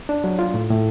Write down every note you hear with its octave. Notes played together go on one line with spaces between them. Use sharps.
D4
F#3
F4
A2
A2